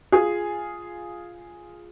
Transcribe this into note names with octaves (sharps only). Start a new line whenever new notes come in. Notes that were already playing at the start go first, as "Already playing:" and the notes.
F4 G#4